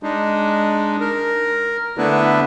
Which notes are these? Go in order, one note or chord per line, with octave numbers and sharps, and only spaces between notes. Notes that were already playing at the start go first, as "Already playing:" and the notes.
G#3 D4 D#4
A#4
D3 A3 B3 D4 E4 B4